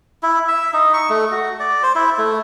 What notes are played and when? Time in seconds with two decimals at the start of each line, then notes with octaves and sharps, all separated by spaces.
0.23 E4
0.48 E5
0.73 D#4
0.94 C#6
1.10 A3
1.32 F#4
1.60 D5
1.83 C5
1.95 E4
2.18 A3